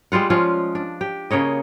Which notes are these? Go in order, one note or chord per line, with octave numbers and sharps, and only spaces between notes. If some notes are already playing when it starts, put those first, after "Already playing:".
G3 G#3 F4 F#5
F3 G#3 C#4 F4
D4
G4
C#3 A#3 C#5 D#5